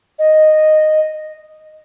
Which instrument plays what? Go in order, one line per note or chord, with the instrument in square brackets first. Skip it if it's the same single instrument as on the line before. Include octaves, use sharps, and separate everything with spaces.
[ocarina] D#5